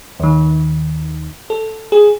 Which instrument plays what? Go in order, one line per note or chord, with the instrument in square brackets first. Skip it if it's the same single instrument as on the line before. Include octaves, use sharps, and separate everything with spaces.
[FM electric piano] D#2 D#3
A4
G#4